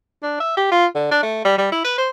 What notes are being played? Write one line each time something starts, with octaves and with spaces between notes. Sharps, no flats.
D4
E5
G4
F4
D3
D4
A3
G3
G3
E4
B4
C5